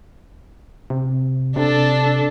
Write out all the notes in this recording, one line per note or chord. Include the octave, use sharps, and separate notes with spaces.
C3
C3 D4 A4